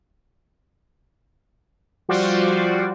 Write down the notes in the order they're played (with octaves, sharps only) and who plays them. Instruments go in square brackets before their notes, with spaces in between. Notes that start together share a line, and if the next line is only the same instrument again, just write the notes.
[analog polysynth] F3 G3 F4 F#4 C5 D5